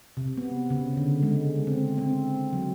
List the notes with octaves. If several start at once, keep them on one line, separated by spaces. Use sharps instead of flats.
C3
B3
C#3
D3
G#3
C4
C4
F#3